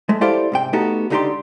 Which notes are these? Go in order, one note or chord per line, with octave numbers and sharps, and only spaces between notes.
G#3 A3
E4 G4 A4 C5 D5 F5
G#2 C3 G5
A3 B3 D#4 F#4 G4 A4
C#2 D3 D#4 G4 D5 C6